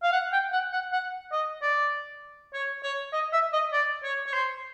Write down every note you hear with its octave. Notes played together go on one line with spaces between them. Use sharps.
F5
F#5
G5
F#5
F#5
F#5
D#5
D5
C#5
C#5
D#5
E5
D#5
D5
C#5
C#5
C5